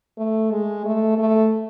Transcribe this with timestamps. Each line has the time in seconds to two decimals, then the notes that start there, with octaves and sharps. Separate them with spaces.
0.18 A3
0.51 G#3
0.85 A3
1.18 A3